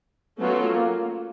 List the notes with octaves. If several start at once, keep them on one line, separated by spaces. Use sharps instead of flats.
F#3 A3 B3 C#4 F4
A#3